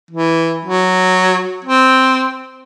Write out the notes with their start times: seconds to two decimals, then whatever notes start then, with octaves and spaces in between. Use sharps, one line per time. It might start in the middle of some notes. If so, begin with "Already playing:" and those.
0.11 E3
0.65 F#3
1.64 C4